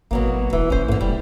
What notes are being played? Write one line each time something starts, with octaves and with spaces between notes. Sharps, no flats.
G#1 B2 F#3 A#3
E1 E3
A1 C#4 C5
G#2 D3 A#3
F1 G3